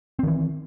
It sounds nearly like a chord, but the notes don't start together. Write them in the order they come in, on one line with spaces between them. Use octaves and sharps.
C4 D#3 E3